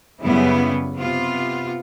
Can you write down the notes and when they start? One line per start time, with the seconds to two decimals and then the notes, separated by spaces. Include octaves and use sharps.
0.22 F#2 C#3 G3 B3 E4
0.96 C3 B3 F4